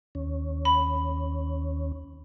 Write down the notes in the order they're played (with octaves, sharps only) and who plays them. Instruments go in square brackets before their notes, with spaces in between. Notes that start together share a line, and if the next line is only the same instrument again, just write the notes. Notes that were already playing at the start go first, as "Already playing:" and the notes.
[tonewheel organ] D#2 C#4
[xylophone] B5